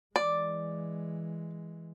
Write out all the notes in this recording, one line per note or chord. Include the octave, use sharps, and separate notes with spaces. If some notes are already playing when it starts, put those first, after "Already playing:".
E3 G#3 D5